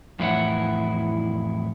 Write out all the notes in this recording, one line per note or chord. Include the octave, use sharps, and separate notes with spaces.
F2 A2 E3 E4 C#5 F#5